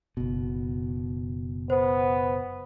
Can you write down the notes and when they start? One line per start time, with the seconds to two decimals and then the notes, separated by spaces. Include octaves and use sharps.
0.17 F#1 B2
1.70 B3 C5